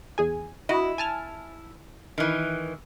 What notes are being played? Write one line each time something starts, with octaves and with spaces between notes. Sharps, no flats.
E2 G#4 G#5
E4 F#4 D#5
G#5 A5 F6
D#3 E3